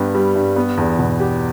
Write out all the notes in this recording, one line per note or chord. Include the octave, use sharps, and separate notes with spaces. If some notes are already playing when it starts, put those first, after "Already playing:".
Already playing: G2 B3 G4
G3
G2
B3
E2
B2
G4